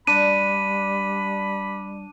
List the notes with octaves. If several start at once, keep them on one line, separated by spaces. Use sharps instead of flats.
G3 D4 B5 D#7